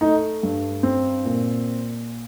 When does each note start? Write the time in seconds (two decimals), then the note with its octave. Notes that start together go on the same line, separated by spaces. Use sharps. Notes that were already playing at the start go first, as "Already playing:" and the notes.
0.01 A3 D#4
0.43 G2
0.83 C4
1.25 A#2